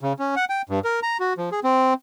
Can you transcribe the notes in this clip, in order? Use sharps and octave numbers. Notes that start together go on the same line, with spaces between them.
C#3
C#4
F#5
G5
G2
A#4
A#5
F#4
F3
G#4
C4